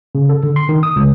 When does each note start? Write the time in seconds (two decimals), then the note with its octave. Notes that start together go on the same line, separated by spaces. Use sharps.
0.15 C#3
0.29 A4
0.43 D3
0.56 C6
0.69 D#3
0.83 D#6
0.96 C#2